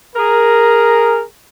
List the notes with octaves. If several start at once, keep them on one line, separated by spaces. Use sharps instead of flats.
G#4 A#4